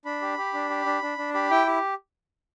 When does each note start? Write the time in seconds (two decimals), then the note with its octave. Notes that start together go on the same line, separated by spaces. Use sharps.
0.05 D4 B5
0.22 G4
0.37 G4
0.54 D4
0.70 G4
0.86 D4
1.02 D4
1.18 D4
1.34 G4 B5
1.50 E4 G5
1.67 G4